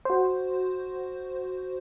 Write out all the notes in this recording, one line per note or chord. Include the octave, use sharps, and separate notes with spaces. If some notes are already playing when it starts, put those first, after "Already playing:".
F#4 C5